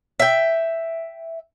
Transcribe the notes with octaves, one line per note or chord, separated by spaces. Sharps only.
E5 G5